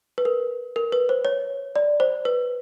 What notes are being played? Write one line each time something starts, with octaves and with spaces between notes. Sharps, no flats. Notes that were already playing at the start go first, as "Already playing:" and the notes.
B4
A#4
A#4
B4
C5
C#5
D5
C5
B4